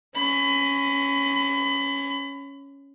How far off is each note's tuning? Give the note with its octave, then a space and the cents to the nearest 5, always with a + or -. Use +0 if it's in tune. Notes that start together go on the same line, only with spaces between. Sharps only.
C#4 +0 B5 +30